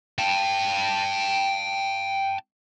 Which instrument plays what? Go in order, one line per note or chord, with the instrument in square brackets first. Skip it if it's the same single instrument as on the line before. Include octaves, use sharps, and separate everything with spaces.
[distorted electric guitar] G5 A5